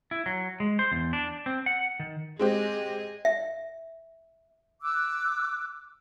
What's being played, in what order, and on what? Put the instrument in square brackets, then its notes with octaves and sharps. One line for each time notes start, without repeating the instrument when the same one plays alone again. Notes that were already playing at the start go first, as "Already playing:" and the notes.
[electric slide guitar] E4
F#3
G#3
C5
E2
D4
C4
F#5
D#3
[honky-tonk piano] G#3 C4 G4 [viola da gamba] G#4 D#5
[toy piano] E5
[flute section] D6 E6 F#6